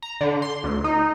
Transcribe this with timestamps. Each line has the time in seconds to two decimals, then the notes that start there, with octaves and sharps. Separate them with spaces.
0.02 A#5
0.21 D3
0.42 C6
0.64 D2
0.84 D#4